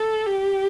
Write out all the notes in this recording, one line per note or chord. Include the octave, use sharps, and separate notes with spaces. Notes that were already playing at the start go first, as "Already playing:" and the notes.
Already playing: A4
G4